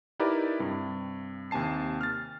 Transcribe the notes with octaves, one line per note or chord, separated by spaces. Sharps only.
D#4 E4 G4 A#4 B4 D5
G2 C3
D#2 C3 G#5 A5 C7
F6 A6